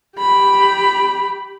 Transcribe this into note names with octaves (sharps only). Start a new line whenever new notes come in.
G4 B5